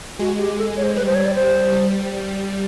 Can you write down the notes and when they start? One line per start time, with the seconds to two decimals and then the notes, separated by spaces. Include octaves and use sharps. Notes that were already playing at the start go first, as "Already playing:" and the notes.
0.19 G#3 F#4
0.38 G4
0.58 A4
0.76 C#5
0.83 C5
0.96 G3 B4
1.06 C5
1.15 C#5
1.25 D5
1.34 C5
1.72 G3